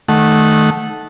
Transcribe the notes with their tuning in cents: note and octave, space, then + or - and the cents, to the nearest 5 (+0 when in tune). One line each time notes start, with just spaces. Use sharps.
D#3 +0 A3 -10 F#5 +0